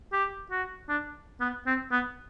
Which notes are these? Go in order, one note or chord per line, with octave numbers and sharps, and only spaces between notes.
G4
F#4
D4
B3
C4
B3